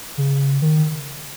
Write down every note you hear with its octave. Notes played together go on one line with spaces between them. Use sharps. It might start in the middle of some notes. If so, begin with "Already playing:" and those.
C#3
D#3